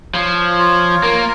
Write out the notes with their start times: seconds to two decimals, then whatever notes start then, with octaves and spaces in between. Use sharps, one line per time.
0.15 F3 C#5
0.59 F4
1.03 A#3 A#4